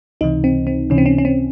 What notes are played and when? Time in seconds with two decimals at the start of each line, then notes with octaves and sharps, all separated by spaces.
0.21 C#2 C3 E3 D#4
0.44 C4
0.67 C4
0.90 C#2 C3 E3 C#4
0.98 C4
1.06 C#4
1.18 C#4
1.25 C4